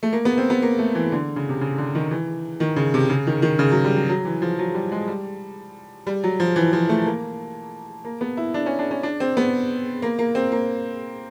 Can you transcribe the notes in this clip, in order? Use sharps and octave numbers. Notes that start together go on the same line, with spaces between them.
A3
A#3
B3
C4
B3
A#3
A3
E3
D3
C#3
C3
C#3
D3
D#3
E3
D#3
C#3
C3
C#3
D#3
D#3
C#3
F#3
G3
F#3
F#3
E3
F3
F#3
G3
G#3
G3
G3
F#3
F3
E3
F3
A3
A#3
A#3
B3
E4
D4
C#4
D4
C#4
D4
C4
B3
A#3
A#3
C4
A#3